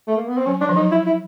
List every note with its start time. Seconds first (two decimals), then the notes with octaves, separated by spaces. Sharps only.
0.07 A3
0.17 A#3
0.28 B3
0.38 C4
0.46 F#3 C#4
0.61 G3 D4
0.69 F3
0.76 F#3 D#4
0.92 E4
1.06 E4